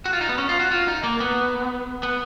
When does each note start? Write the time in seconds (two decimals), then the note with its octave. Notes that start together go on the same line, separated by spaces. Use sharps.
0.06 F#4
0.13 F4
0.21 D#4
0.29 B3
0.38 C#4
0.49 F4
0.60 F#4
0.71 F4
0.88 D#4
1.04 A#3
1.20 B3
2.03 B3